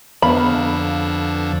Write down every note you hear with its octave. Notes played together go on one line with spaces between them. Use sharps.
F2 D3 B3 F5 B5